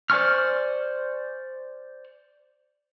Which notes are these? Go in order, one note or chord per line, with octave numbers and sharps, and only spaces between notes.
C5 D5 G#5 C#6 F6